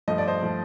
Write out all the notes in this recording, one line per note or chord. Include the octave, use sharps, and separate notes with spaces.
G2 F3 A3 D#5
D5
C5 D#5
F3 A3